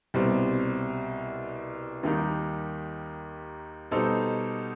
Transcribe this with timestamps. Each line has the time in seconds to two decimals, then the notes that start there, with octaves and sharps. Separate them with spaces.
0.14 C2 B2 G3 C4
2.03 D#2 D#3 G3 D#4 G4
3.91 B2 G3 D#4 A4 C5